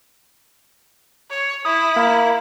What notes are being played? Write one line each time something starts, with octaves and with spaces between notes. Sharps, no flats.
C#5
E4 D#6
A#3